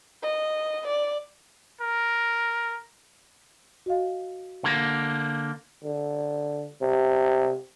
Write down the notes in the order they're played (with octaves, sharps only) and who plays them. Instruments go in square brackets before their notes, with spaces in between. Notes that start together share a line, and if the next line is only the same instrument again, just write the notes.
[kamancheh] D#5
D5
[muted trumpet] A#4
[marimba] F#4 D#5 F5
[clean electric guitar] D3 A#3
[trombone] D3
C3